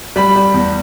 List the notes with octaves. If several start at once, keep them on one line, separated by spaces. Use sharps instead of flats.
G3 B5
G3
E2